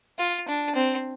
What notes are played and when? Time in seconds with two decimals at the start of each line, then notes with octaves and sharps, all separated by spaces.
0.19 F4
0.48 D4
0.75 C4